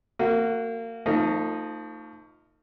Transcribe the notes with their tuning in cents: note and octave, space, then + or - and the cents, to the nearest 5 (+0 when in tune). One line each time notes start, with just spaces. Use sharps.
A#3 -30 F#4 +0
F3 +0 A3 +40 D#4 +0